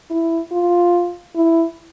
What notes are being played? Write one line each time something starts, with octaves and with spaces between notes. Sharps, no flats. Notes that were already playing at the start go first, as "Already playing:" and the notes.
E4
F4
E4